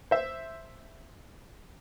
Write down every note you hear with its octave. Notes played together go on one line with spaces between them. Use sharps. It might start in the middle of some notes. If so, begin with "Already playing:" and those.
C5 E5